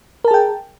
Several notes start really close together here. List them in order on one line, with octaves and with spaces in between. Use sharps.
A#4 A5 G#4 G5